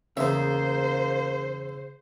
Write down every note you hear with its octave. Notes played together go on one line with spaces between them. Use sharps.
E2 C#3 A#3 C5 E5